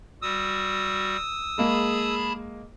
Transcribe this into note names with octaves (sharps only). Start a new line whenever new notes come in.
G3 F#4 D#6 E6
G#3 A#3 G#4 A5 B5